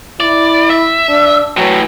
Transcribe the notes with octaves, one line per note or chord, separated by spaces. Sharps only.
E4 D5
E5
D4
A2 E3 F#3